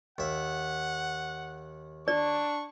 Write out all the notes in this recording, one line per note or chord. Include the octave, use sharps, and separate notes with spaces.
D#2 E5 F#5
D4 D5 C#6